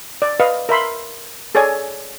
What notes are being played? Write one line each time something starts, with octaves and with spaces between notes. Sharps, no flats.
D5
B4 D#5 F5
A#4 E5 B5 C6
G#4 A4 C#5 D5 G#5